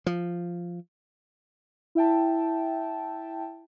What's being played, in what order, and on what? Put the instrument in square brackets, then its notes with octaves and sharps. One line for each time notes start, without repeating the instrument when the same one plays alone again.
[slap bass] F3
[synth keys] E4 E5 G5 A5